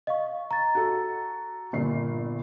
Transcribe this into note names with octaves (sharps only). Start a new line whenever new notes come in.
D#5 F5 C#6
A#5 A6
F#4 A4
G1 A#2 C7